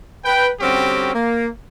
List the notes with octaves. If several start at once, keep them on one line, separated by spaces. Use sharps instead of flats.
B4 G5
D3 G3 C4 C#4 F#4 G4
A#3